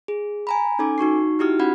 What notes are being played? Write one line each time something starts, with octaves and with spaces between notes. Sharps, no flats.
G#4
G#5 A#5 B5
C#4 D#4 A4 G#5 D6
D#4 F#4 C#6 C7
D#4 E4 F#4 G4 D#6 F6
C#4 F#4 F#5 B5 G#6